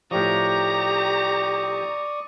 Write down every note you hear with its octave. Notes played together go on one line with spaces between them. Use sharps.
A2 F3 G4 D5 A#5 C#6 D#6